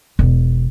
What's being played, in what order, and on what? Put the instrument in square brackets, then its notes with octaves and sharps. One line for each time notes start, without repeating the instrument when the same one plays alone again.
[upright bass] E1